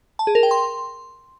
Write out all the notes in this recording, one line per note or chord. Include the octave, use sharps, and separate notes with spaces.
A5
G#4
A#4
G5
C6